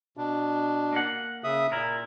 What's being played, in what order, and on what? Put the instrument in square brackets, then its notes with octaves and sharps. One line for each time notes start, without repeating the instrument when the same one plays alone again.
[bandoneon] B2 D4
[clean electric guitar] A#3 F#5
[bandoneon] C#3 E5 D#6
[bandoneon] A#2 [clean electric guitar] E4 A#4